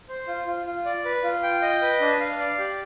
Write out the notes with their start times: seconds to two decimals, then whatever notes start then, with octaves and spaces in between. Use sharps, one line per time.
0.09 C5
0.28 F4
0.47 F4
0.66 F4
0.85 D5
1.05 B4
1.23 F4
1.43 G5
1.62 D#5
1.82 B4
2.00 D4
2.20 F5
2.39 D5
2.58 G4